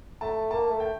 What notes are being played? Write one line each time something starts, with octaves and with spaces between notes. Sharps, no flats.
A3 A5
A#3 A5
A3
G5